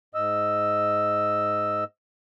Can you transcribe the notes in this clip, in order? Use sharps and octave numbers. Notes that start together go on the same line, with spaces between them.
G#2 D#5 E6